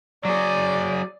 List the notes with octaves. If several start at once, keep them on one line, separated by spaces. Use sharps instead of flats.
F#3 G#4 D5